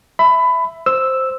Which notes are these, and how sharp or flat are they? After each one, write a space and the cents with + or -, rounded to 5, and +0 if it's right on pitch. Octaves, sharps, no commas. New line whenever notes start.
E5 +0 B5 +20
C5 +0 E6 +0